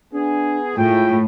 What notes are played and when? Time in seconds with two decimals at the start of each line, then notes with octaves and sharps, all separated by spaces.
0.13 B3 D4 G#4
0.78 A2 G#3 F4 G5